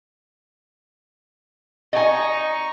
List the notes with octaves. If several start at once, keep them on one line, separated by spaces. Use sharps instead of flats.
D#4 D#5 G#5 C#6